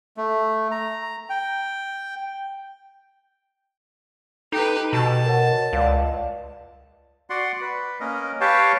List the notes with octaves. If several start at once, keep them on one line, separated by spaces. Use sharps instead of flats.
A3
A#5
G5
D#4 G4 A4 B4
B2 A5
A#4 C#5 F#5
C#2 D5 F5
F#4 D5 F#5 C6
B4
A#3 C#4 A#4 D#5
G4 B4 C#5 F5 G5 A5